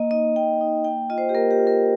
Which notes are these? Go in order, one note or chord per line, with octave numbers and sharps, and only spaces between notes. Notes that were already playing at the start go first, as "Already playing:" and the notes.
Already playing: A#3 D#5
D#4 D#5
A#3 G5
D#4
A#3 G5
F4 D#5
C5
G4
A#3 A#4
G4
F4
A#4